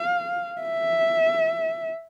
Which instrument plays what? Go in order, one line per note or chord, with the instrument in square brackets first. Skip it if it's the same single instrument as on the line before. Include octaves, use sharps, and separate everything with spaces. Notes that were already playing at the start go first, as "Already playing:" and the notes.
Already playing: [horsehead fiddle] F5
E5